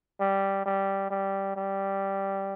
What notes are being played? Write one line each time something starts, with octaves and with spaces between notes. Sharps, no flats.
G3
G3
G3
G3